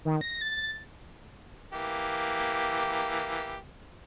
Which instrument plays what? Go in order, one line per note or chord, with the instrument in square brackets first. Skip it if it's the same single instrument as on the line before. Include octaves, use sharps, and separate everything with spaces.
[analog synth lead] D#3
A#6
A6
[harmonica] E3 A#3 G4